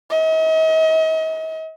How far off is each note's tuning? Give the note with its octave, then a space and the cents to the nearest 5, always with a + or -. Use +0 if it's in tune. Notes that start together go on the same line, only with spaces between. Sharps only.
D#5 +40